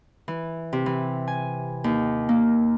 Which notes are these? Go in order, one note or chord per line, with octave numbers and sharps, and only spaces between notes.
E3
C3
E3
G#5
D#2
A#3